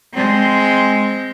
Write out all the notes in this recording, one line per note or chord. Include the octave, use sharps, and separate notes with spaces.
G#3 C4